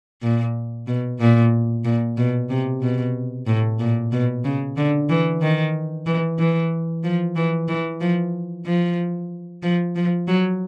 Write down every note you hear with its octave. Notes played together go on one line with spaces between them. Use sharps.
A#2
B2
A#2
A#2
B2
C3
B2
A2
A#2
B2
C#3
D3
E3
D#3
E3
E3
F3
E3
E3
F3
F3
F3
F3
F#3